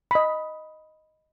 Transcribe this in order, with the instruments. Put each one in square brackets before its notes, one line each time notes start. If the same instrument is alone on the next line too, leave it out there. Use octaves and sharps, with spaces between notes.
[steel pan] D#5 B5